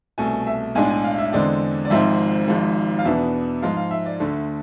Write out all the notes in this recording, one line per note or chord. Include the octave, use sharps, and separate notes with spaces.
C2 B2 A3 G#5
E5
B1 A2 G#3 D4 G#5
G#5
F5
E5
E2 D3 G#3 C4 D5
D5
G#1 G#2 F3 G#3 C4 E5
G#1 G#2 F3 G#3
F5
E2 B2 B3 D4 E5
G#2 F3 G#3 F5
F5
E5
D5
D2 D3 A3